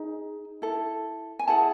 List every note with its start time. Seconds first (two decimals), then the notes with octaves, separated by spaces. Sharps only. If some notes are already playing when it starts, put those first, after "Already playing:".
Already playing: D#4 G#4
0.62 E4 A4
1.39 G#5
1.48 E4 G#4 F#5 A5